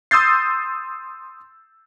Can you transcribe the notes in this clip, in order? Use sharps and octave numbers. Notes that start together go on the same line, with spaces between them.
C6 D#6 E6 G6 A6 C7